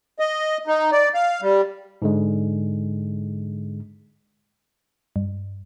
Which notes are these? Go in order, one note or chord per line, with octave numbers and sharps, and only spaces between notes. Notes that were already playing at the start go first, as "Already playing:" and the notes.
D#5
D#4
D5
F5
G3
G#2 D3 G#3
G2